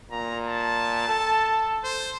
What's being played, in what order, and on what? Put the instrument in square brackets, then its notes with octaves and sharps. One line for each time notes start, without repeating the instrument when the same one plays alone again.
[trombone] A#2 [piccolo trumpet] A#5
[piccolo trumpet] A5
[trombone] A4
[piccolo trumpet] C5